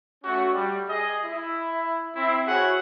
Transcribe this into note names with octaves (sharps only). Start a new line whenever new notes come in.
A3 C#4 F#4
G3
G#4 D#5
E4
C4 E4
E4 F#4 G#4 C#5 F#5